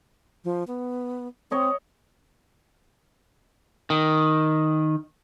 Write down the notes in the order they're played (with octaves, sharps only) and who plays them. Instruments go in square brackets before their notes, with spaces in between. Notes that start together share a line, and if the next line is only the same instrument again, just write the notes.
[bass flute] F3
B3
[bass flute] C4 [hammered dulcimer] C#5 D#5 C#6
[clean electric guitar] D#3